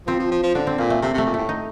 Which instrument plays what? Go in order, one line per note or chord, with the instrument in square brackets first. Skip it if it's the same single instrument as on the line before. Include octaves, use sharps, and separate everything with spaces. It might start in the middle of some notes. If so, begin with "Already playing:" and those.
[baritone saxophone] F3 [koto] C4
[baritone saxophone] F3
F3
F3
[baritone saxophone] D3 [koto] D4
[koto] C4
[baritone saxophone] A#2 [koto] A#3
[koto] A3
[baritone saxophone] C3 [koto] A3
[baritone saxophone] C3 [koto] A3
[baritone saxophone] A#2
[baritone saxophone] A2 [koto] A3
[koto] D#4